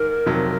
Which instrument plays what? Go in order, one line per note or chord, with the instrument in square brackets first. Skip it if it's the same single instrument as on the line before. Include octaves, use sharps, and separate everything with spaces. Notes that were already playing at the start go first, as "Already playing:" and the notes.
Already playing: [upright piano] G#2 D#3 [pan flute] A#4
[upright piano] F2 C3 D#3 F#3